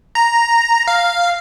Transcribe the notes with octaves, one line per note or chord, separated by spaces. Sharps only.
A#5
F5